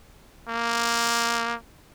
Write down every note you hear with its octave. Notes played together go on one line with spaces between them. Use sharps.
A#3